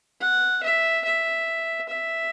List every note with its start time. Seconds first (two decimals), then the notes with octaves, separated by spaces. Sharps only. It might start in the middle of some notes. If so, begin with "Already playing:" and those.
0.21 F#5
0.63 E5
1.05 E5
1.89 E5